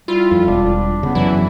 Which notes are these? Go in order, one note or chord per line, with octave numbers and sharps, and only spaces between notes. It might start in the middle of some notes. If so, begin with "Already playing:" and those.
G3 E4 F4
F2
E1 D4
C#3 B3
F#2 E3 F#3 E4